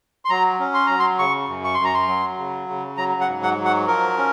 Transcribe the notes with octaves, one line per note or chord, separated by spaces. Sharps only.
C6
F#3 A#5
C#4
C6
F#3 A#5
C6
C#3 C#6
F#2
C#6
C6
F#2
A#5
C6
F#3
C#3
C#3
F#3 A#5
F#5
G#2
F#5
F#3
F#5
F3 A#4
C#4